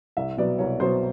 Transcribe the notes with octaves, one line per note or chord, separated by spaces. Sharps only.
C2 E5
B2 F#3 B3 D5
C2 C#5
B2 F#3 B3 C5